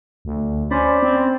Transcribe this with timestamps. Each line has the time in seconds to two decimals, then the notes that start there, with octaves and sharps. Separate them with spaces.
0.25 D2
0.71 C#4 C5 D5 B5
1.03 C4